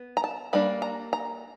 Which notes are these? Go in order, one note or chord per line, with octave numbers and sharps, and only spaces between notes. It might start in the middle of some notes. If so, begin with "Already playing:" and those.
Already playing: B3
A#5
A5
G3 A#3 D4 B5
A#5
A#5